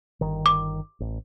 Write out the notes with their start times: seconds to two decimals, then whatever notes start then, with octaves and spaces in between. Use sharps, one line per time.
0.21 G1 D#3
0.46 D6
1.00 A1